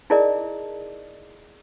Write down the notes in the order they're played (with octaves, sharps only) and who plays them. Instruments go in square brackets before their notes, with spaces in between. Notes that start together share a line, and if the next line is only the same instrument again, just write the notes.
[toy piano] D#4 E4 G#4 A#4 D5 D#5